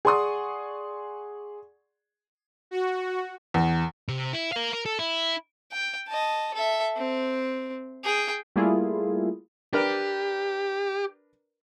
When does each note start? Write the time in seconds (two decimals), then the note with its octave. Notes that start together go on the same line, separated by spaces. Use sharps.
0.05 G#4 D5 F#5 C6 C#6 D#6
2.71 F#4
3.54 E2
4.08 C3
4.33 E4
4.52 A#4 F5
4.73 A#4
4.86 A4
4.99 E4
5.72 G5
6.08 D#5 A5
6.54 A4 E5
6.97 C4
8.04 G#4 G5
8.56 G3 A3 A#3 E4 F4 G#4
9.73 D4 G4 A#4 B4